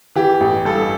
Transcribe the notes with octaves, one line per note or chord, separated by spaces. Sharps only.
E3 G4
A1
G2 A4